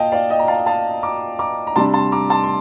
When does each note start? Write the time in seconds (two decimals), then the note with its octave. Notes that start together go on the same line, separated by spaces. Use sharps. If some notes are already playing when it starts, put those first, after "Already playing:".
Already playing: A#2 D#5 F5 G5 A5
0.12 D5 F5
0.30 D#5 G5
0.39 A#5
0.48 F5 A5
0.66 F5 A5
1.03 A#5 D6
1.39 A#5 D6
1.67 A#5
1.76 C3 G3 D4 A5 C6
1.94 A5 C6
2.12 A#5 D6
2.30 A5 C6
2.44 C6